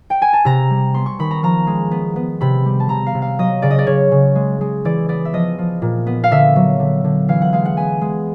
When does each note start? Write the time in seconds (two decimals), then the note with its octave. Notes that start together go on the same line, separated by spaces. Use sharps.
0.10 G5
0.22 G#5
0.33 A5
0.45 C3 A#5
0.70 G3
0.94 B3 C6
1.06 C#6
1.19 D#3 B5
1.31 A#5
1.43 F3 A#5
1.67 G#3
1.91 B3
2.16 B3
2.41 C3 B5
2.66 G3
2.80 A5
2.89 C3 A#5
3.06 F5
3.15 C3
3.22 F5
3.39 F#3 D#5
3.62 C#3 D5
3.71 D#5
3.78 D5
3.87 C#3 C#5
4.12 C#3
4.35 G#3
4.61 G#3
4.85 E3 D5
5.09 B3 D5
5.25 E5
5.33 F3 D#5
5.58 F3
5.82 A#2
6.06 B3
6.24 F5
6.31 D3 E5
6.56 F#3
6.80 D3
7.04 D3
7.28 E3 F5
7.42 F#5
7.53 G#3 F5
7.65 F#5
7.77 B3 G#5
8.01 G#3